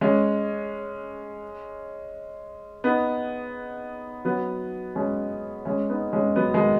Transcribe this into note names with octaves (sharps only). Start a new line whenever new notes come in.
G#3 C#4
B3 D#4
F#3 B3
G#3 C#4
G#3 C#4
B3 D#4
G#3 C#4
F#3 B3
D#3 G#3